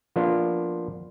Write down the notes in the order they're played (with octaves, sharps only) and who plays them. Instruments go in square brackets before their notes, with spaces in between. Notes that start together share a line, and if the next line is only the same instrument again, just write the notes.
[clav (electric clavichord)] F3 A#3 B3 D4 F4